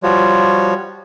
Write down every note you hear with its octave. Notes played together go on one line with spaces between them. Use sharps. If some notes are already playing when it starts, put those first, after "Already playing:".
F3 G3 F4 F#4 C#5